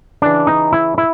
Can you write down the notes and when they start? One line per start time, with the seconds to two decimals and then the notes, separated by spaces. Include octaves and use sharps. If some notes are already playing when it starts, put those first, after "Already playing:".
0.22 C#3 E3 D4
0.47 D#4
0.72 E4
0.98 E4